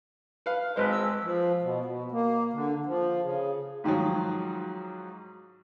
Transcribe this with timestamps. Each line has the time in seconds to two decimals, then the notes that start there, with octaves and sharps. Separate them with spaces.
0.46 B4 F5
0.76 G#1 G#3 B4 C5
0.90 E6
1.21 F3
1.62 B2
1.85 B2
2.12 A#3
2.53 D3
2.86 F3
3.22 C#3
3.84 G#2 D#3 F3 F#3